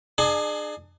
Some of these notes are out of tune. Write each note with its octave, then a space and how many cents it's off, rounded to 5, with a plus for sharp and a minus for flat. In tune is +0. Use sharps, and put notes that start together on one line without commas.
D4 +40 G#4 +10 G#5 +30